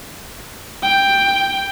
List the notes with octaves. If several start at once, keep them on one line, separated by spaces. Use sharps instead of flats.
G5